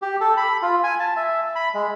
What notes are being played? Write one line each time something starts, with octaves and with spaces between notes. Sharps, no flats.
G4
A4
B5
F4
G#5
A5
E5
B5
G#3